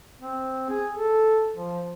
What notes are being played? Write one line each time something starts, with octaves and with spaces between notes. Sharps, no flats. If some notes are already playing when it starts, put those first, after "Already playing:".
C4
G#4
A4
F3